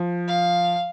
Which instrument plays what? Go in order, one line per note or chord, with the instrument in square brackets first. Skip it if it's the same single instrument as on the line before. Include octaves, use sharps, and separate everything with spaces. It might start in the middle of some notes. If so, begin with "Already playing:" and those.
Already playing: [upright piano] F3
[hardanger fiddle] F5